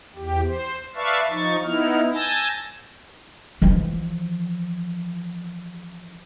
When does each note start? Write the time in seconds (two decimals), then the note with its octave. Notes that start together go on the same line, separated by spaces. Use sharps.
0.16 E2 G4
0.47 C5
0.95 B4 D5 E5 F5 A5 C#6
1.30 F3 D#4 C#6 A6
1.64 B3 D#4 E4 F6
2.14 G#5 A5 E6 G6 A6 A#6
3.62 E3 F3